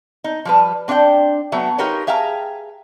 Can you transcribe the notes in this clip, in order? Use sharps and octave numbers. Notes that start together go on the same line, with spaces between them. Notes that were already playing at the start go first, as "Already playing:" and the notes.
D#4
F3 G3 B4
C4 D4 D5 F5 G5
F#3 A3 B3 E5
D#4 F4 G4 A#4 B4 C#5
G#4 E5 F5 G5 A5 A#5